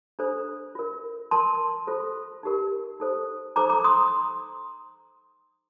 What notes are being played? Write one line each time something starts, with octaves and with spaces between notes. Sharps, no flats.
D4 A4 C5
F4 A#4
F4 A#4 A5 C6
F4 A4 C5
D#4 G4 A#4
D#4 A4 C5
D#4 A4 C5 A#5 D6
A#5 D6
C6 D#6